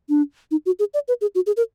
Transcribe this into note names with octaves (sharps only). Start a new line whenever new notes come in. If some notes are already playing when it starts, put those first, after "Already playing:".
D4
D#4
F#4
G#4
D5
B4
G#4
F#4
G#4
A#4